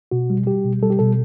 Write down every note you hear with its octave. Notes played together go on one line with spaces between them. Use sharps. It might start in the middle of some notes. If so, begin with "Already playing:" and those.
B2 F#4
G3
G3 G4
B2
G3 A4
G4
B2 A4